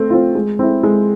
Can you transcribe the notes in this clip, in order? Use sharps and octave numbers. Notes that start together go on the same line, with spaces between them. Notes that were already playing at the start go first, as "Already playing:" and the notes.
Already playing: A3 C4
C4 F4
G#3
C4 E4
G#3